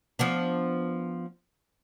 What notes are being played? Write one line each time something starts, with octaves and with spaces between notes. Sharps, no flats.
F3 B3 D4